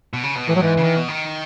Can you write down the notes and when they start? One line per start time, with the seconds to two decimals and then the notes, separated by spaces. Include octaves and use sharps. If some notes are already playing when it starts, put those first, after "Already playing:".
0.14 B2
0.23 C#3
0.35 B2
0.47 A2 E3
0.55 F#3
0.61 G#2 E3
0.77 C#3
0.84 D#3
0.96 B2
1.08 D#3